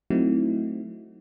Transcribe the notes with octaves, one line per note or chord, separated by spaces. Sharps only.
F#3 A3 C4 D#4 E4 F#4